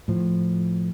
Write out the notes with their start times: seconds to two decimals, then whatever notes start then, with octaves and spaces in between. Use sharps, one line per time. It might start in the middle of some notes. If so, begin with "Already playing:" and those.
0.08 A2 F3